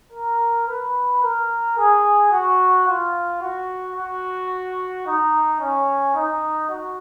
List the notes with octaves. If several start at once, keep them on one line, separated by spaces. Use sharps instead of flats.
A#4
B4
A#4
G#4
F#4
F4
F#4
F#4
D#4
C#4
D#4
F#4